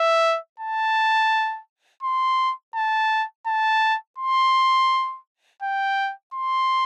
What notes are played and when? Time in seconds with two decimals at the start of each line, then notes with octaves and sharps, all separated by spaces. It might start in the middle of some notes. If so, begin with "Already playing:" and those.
Already playing: E5
0.60 A5
2.03 C6
2.75 A5
3.46 A5
4.18 C6
5.62 G5
6.34 C6